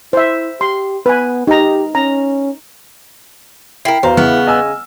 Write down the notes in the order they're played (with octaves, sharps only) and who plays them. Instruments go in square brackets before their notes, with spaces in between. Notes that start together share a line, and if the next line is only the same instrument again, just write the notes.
[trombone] E4 [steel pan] C5 E5
[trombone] G4 [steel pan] C6
[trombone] B3 [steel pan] B4 G#5
[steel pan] D#4 A#5 [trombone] G4
[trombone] C#4 [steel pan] A#5
[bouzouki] E4 A#4 [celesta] G5 C7
[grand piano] E2 F5 A#5 [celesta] F#4 B4 [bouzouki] C5
[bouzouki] C#3 [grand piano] E3 [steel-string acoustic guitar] B3 [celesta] F6
[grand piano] D#5 G#5 E6